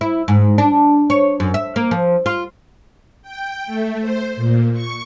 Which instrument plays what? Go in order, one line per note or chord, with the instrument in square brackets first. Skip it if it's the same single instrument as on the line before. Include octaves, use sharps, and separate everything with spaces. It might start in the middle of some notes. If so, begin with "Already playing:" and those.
[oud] E4
G#2
D4
C#5
F#2
E5
A#3
F3
F4
[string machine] G5
A3
C5
A#2
C#6